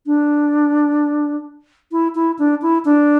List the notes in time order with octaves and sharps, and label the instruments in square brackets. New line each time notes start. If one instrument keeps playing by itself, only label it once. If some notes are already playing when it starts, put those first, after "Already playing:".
[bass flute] D4
E4
E4
D4
E4
D4